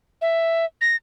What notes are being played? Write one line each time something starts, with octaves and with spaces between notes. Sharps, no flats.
E5
A#6